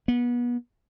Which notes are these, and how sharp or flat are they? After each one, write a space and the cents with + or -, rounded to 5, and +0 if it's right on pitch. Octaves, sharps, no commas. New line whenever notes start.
B3 -30